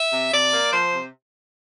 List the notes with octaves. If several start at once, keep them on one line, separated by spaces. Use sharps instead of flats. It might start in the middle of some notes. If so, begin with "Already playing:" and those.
Already playing: E5
C3
C3 D5
A#3
F3 C5
C3